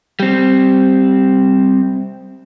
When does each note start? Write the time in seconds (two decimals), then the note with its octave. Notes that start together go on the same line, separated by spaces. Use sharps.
0.20 G3 C4